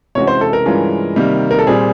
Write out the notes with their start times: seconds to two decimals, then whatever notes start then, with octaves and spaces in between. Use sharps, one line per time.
0.15 C3 E3 G#3 C#4 F#4 C#5
0.27 C5
0.41 A4
0.53 A#4
0.66 G2 E3 G#3 C#4 F4
1.16 C3 D#3 G3 A#3
1.51 A#4
1.59 A4
1.67 A#2 G3 C4 G#4